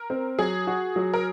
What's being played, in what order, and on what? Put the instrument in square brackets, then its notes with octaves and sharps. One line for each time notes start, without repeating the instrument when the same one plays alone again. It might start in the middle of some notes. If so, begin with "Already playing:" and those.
Already playing: [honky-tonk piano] A#4
[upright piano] C4
[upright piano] F#3 [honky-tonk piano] G#4
[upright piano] F#4
F#3
[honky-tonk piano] A#4